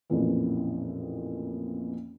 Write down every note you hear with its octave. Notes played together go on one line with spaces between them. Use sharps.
A1 F2 A#2 E3